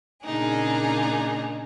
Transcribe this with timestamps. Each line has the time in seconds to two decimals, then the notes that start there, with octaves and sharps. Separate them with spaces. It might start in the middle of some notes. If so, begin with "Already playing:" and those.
0.22 A#2 C#3 D4 D#4 G#4